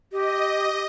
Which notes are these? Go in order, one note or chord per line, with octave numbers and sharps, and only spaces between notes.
G4 D#5